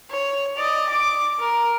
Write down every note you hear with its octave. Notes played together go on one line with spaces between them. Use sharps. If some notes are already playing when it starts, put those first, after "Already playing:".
C#5
D5 D#5
D6
A#4